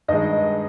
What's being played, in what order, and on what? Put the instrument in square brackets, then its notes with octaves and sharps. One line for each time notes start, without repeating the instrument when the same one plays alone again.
[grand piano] G2 D#3 G#3 [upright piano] D#5